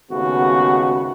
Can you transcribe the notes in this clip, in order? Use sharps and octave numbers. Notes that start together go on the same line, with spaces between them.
G#1 D#2 C#3 A3 B3 F#4